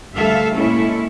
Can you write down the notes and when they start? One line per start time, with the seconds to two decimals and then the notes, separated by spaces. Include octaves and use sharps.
0.14 D2 G3 A4 E5 F5
0.55 A#2 G#3 C#4 E4 A4